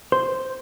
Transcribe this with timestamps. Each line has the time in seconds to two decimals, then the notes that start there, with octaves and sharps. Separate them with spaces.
0.12 C5